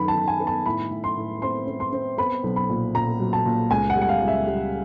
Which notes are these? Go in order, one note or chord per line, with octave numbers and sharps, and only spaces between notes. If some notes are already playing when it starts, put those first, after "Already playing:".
Already playing: F#2 D#3 B3 B5
A5
D#3
G#5
B3
A5
A2 B5
A2
C6
A2
C4 C6
C4
C6
C4
B3 B5
B1
B5
A#2
A#2 A#5
F#3
A5
A#2
C#2 G#5
F#5
G3
F#5
F5
C#2
E5
G3